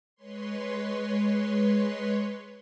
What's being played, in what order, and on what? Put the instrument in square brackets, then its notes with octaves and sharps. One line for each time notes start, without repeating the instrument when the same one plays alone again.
[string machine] G#3 B4 C#5 C6